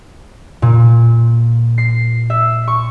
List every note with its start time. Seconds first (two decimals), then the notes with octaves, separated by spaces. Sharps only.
0.62 A#2
1.78 C7
2.30 E5
2.68 C#6